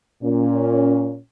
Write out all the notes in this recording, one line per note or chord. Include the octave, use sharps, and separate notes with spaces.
A#2 C#4